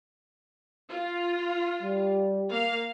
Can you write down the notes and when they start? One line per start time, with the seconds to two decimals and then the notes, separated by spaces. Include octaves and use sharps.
0.90 F4
1.83 G3
2.50 A#3 F5